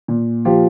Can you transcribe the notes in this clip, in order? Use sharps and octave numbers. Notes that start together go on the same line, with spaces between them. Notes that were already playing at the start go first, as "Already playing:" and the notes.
A#2
F3 F4 G4